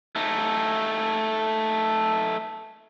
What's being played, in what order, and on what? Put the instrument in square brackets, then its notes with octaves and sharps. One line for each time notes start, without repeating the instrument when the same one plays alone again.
[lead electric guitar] A3 D#4